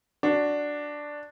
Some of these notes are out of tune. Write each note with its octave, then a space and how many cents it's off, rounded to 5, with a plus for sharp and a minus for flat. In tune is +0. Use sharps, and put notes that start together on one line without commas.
D4 +0 F#4 +0